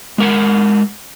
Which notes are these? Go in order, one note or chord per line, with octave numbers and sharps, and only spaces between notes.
G#3 A#4 F#5